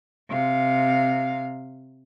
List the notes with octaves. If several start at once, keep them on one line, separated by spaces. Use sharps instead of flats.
C3 F5